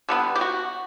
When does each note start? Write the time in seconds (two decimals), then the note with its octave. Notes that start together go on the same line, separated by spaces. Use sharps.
0.09 D3 G3 B3
0.35 G4
0.41 F#4